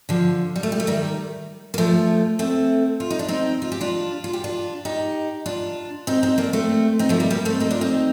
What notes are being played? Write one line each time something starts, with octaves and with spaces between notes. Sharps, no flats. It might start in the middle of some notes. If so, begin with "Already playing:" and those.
D3 F3
G3
A3
G3
A3
D#3 G3
A#3
F3 A3
A3 C4
F4
D#4
D4
C4 D#4
F4
G4
D4 F4
F4
G4
D4 F4
D#4 G4
D4 F4
C4 D#4
C4 D#4
A#3 D4
A3 C4
C4 D#4
F3 A3
G3 A#3
G3 A#3
A3 C4
C4 D#4
D4 F4
C4 D#4